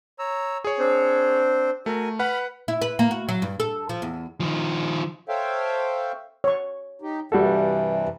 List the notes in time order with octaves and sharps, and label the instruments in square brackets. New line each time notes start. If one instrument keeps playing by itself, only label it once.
[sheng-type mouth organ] C#5 A#5 E6
[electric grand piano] G#4 C#5
[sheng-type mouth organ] C4 D4 C5
[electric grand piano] A3 [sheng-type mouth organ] F#4 A#4 G#5
[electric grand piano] B4 F#5 [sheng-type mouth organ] B5 F6
[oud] E4
B4
A#3
F#4
F#3
G2
A4
F3
E2
[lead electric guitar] D#3 F3
[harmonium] A4 C5 C#5 E5 F5 G5
[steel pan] C#5 C#6
[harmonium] D#4 G4
[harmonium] G2 C3 E3 [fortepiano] G3 F#4 A4